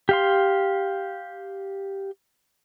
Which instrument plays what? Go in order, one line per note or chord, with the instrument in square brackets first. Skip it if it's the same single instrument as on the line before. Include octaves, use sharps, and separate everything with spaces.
[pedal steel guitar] G4 F5 C6